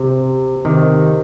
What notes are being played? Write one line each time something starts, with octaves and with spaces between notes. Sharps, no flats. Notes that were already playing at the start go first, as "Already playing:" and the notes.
Already playing: C3
C3 D#3